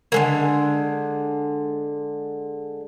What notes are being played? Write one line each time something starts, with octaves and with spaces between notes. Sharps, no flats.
D3 G#3 A#3